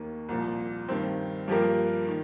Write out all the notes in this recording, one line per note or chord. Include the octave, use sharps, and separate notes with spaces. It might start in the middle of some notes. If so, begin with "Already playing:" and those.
Already playing: D#2 D#3 A#3
C2 A#2 F3
G2 D#3 C4
G2 F3 A#3 G4 A#4
D#3